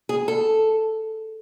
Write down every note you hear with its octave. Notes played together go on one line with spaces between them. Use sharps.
G#4
A4